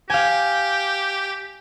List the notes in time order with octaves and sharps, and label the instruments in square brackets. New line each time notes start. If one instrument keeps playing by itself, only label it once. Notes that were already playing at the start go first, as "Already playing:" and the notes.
[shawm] G4 [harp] F5 G#5